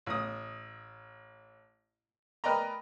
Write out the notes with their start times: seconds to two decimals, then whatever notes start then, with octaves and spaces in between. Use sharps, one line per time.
0.06 A1 D#6
2.44 A#4 B4 D5 D#5 G5 A#5